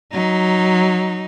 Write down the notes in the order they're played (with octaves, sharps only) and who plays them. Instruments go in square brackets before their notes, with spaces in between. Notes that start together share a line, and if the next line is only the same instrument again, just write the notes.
[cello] F#3 D#4